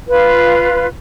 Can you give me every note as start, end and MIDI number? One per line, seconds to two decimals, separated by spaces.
0.08 0.86 65
0.08 0.86 71